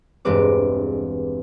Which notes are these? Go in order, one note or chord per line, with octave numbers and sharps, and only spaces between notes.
E1 G2 G#3 C4 B4 D6